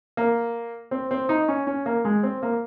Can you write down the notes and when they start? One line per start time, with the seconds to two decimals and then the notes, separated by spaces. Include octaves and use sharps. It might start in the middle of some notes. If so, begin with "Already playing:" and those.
0.17 A#3
0.91 C4
1.11 C4
1.29 D#4
1.48 C#4
1.67 C#4
1.86 A#3
2.05 G#3
2.23 C4
2.43 A#3